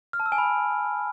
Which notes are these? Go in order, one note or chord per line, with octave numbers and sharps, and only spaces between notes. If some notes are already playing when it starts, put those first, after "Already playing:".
F6
A5
E6
G#5
B5